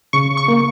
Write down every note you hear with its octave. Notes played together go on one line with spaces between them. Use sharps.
C#3 C#6
C#6
A#3